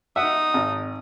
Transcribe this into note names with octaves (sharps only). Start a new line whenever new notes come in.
D#4 E5 F#5 D#6
G#1